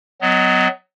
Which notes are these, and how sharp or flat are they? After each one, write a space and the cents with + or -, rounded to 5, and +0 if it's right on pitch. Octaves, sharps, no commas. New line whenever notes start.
F#3 +0 B3 +30 D#5 +0